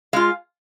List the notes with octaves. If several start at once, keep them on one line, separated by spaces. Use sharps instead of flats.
G#3 F4 F5